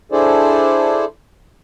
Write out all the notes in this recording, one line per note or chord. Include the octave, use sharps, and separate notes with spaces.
D4 E4 G#4 A4 C5 D5